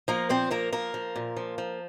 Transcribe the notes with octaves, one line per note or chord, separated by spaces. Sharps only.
F3 A#3 A#4
A#2 C4 C5
F3 A#3 A#4
F3 A#3 A#4
F3
A#2
F3
F3